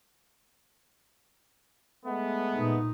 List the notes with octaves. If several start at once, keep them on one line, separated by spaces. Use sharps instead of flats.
G#3 A3 B3
A#2 D#4